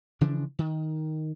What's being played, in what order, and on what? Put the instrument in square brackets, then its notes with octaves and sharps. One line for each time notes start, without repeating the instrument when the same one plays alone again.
[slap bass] C#3 E3 F3 D4
D#3